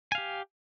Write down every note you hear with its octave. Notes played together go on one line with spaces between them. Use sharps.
G4 F5 G#5